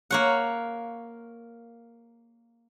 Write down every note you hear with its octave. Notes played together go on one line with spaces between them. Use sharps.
A#3 C#5 F#5